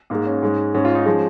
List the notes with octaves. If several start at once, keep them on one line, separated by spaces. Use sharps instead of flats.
G#2 G#3 A#3
C#4
G#2 G#3
G#2 G#3 C#4
F4
D#4
F3 G#3 C#4